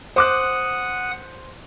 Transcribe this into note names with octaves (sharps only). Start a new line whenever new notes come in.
C5 F#5 D6 D#6 F#6